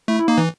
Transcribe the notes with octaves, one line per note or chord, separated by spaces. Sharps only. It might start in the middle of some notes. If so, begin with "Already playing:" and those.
A3 E4
E4
A#3 D#4
E3